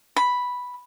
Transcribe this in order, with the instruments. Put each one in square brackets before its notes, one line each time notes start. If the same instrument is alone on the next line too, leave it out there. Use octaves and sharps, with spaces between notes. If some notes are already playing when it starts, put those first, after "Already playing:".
[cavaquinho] B5